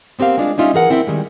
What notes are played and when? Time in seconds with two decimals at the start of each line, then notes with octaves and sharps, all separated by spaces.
0.19 B3 C4 G4 A#4 F5
0.37 G#3 D4 F4
0.58 G3 C#4 D#4 F4 D5 E5
0.74 E3 G#4 A#4 F#5
0.90 D2 C4 E4 A#4 E5 G5
1.07 D#3 G3 G#3